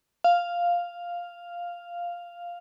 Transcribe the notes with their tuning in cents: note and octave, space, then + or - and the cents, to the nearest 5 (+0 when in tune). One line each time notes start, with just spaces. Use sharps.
F5 +0